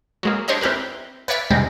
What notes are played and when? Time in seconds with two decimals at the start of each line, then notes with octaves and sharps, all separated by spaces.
0.23 F#3 G#3 A#3
0.48 D4 G4 C5 C#5 D#5 A#5
0.61 C4 E4 G4 A#4 B4
1.28 B4 C#5 D5 E5 F6
1.51 E2 C3 G3 G#3 C4 D#4